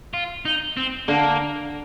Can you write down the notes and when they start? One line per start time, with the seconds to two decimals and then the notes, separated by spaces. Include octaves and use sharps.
0.13 F4
0.45 D#4
0.77 C4
1.08 D3 A#3